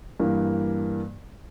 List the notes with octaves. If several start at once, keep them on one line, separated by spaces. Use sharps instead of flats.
G2 E3 A#3